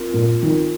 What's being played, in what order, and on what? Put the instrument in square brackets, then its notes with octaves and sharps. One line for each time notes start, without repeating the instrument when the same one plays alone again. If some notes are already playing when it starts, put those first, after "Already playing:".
Already playing: [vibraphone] C4 F4 A#4
[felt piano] A#2 [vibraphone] F4 A#4
[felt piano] D#3 [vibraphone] C4